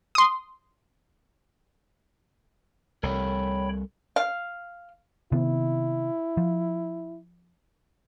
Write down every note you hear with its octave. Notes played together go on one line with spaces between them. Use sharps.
C6 D#6
C2 G3 A4 A#4 C#5 G5 B5
F5
C3 D#3 B3 E4
F3